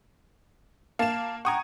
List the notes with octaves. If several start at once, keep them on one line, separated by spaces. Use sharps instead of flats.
A#3 F5 A5 E7
F#5 G5 A#5 C#6 D#6 G#6